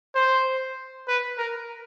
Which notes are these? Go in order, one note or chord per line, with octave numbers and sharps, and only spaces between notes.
C5
B4
A#4